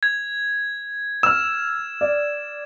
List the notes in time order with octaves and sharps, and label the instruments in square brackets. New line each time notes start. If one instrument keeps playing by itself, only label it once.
[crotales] G#6
[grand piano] E6 F6 [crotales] E7
[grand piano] D5